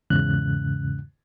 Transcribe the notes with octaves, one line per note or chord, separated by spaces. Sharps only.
E2 G#2 C#3 F#6